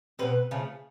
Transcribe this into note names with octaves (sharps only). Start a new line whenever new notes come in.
B2 G3 C4 B4
C#3 F3 A3